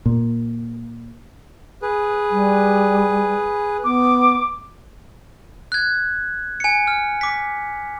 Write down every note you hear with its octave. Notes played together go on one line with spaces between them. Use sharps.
A#2
G#4 B4
G3
B3 D6
F#6 G#6
G#5 C#7
F6
D6 B6